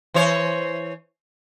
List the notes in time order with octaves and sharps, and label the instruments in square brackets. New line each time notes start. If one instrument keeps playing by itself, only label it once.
[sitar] E3 C5 C#5